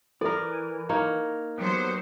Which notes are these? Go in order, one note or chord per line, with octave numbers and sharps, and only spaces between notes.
E3 E4 A4 A#4 D5
A#3 D#4 C#5
F#3 B3 G4 C5